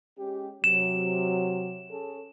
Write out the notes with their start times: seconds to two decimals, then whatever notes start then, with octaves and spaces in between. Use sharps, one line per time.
0.18 G#3 C#4 G4
0.64 C3 F#3 E7
1.90 C#4 G#4 A4